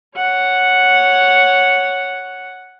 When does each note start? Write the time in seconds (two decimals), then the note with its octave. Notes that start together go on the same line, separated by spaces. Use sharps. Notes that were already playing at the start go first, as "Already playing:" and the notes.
0.17 C#5 F#5